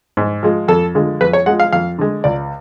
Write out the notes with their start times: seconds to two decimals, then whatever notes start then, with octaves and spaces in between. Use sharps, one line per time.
0.17 G#2
0.43 F3 G#3
0.68 F2 A4
0.95 D3 F3 G#3
1.21 F2 B4
1.33 C#5
1.46 F3 G#3 F#5
1.60 F5
1.73 F2 F5
1.99 D3 G#3
2.24 C#2 D5